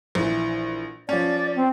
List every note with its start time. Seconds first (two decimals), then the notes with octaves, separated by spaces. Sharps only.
0.15 A#1 E3
1.09 F3 C#4 D5
1.56 C4